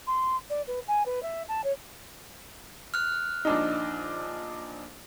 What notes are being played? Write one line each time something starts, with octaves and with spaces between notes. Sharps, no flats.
C6
D5
B4
G#5
B4
E5
A5
C#5
F6 F#6
A#1 D4 D#4